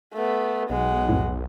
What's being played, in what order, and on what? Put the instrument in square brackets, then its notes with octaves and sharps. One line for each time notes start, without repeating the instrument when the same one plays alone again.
[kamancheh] A3 B3
[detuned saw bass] B1 [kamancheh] G#3 F#5
[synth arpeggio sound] F2 A2